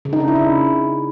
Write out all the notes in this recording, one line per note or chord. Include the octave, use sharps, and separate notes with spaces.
C#3
D#4
D4
E4
C#3